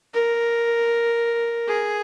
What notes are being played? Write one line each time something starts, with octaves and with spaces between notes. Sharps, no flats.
A#4
G#4